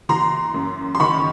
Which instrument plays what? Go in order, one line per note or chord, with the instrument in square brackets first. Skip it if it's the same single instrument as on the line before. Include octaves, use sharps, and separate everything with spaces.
[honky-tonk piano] E3 A#5 C6
F#2
C6
D#3 B5 C#6